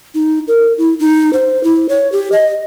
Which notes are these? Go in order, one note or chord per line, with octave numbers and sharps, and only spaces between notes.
D#4
A#4
E4
D#4
C5
E4
C#5
G4
D#5